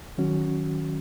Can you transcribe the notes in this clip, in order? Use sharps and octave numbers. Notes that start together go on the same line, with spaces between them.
D#3 F#3 C#4 F#4